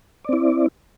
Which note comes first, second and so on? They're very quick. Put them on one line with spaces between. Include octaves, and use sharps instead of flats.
D5 C4 E4